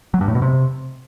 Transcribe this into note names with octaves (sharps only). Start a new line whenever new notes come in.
F#3
G2
A2
B2
C3